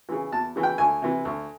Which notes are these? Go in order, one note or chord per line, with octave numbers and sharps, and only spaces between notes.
C#3 E3
E2 A5
C#3 E3
G5
D2 G#5
C3 E3
D2